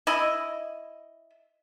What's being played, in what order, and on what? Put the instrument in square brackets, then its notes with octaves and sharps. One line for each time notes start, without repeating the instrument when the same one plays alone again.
[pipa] E4 D#5